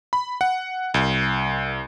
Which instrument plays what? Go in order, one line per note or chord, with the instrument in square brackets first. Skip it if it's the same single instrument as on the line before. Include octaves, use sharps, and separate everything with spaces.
[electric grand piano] B5
F#5
C2